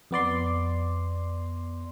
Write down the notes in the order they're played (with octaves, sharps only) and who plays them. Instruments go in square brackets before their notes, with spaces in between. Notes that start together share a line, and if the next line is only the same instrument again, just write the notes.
[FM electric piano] F2 B3 D5 C6